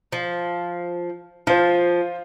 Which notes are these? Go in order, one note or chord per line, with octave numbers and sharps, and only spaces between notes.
F3
F3 F4 C5